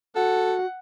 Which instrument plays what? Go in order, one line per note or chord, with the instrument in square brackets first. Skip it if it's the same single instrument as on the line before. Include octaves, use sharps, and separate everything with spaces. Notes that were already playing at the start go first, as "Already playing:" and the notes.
[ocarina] F#4 [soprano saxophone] A4 [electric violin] F#5